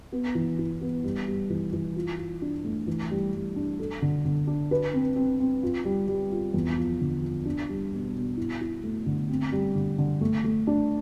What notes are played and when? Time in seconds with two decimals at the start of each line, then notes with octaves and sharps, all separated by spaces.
0.12 B3
0.35 E3
0.59 E4
0.81 B3
1.04 G3
1.27 G3
1.50 E3
1.73 E3
1.96 F4
2.18 F4
2.42 D4
2.64 A3
2.87 E3
3.11 G3
3.33 G3
3.56 D4
3.80 A4
4.02 D3
4.25 D3
4.47 D4
4.71 B4
4.93 C4
5.16 C4
5.40 C4
5.63 F4
5.85 G3
6.08 G3
6.32 F4
6.54 E2
6.77 F3
7.01 D3
7.23 F3
7.45 D4
7.69 G3
7.92 B2
8.15 B2
8.37 E4
8.61 E4
8.83 A3
9.06 D3
9.29 C4
9.52 G3
9.75 D3
9.98 D3
10.21 A3
10.44 A3
10.67 D4